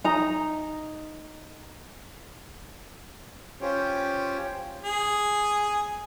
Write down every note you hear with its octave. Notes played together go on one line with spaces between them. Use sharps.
D#4 A#5
C#4 F4 G4 C5 C#5 G5
G#4